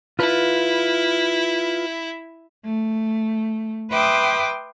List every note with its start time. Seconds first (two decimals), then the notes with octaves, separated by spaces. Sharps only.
0.19 E4 F4 B4
2.64 A3
3.90 B4 E5 G5 C6 D6 D#6